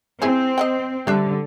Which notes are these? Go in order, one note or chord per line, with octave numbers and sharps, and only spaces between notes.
C4 E4 G#4 C5
D#5 F#5 G5
D3 G3 A3 D4 E5